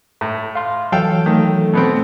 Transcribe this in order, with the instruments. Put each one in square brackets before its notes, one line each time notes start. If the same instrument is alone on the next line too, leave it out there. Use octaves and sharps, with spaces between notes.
[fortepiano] A2
[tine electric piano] F5 C6
[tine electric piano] E3 F#3 [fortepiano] A4 F5 G5
[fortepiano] D#3 [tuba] A3
[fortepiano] B2 B3 C4